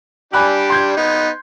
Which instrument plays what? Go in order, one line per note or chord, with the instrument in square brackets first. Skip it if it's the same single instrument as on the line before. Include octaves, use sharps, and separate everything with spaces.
[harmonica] G3 D4 G4 [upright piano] G#5 B5 F#6
[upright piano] C6 G6 G#6
[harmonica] B3 D#4